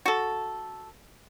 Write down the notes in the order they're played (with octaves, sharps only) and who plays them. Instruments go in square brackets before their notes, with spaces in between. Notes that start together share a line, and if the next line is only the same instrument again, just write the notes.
[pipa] F#4 A4